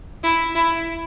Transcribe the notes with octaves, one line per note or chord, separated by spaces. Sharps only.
E4
E4